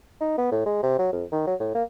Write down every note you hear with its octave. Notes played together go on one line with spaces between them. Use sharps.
D#4
B3
A2
G#3
C3
F#3
F2
D#3
F#3
A2
A#3